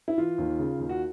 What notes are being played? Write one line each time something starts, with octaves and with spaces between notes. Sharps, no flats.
E4
E3 F4
D#2
C#3
D#2
F#4